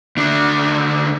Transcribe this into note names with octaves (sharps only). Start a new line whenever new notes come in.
D2 D4